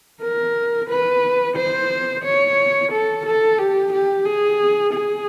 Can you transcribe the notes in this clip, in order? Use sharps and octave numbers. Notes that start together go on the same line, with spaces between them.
A#4
B4
C5
C#5
A4
A4
G4
G4
G#4
G#4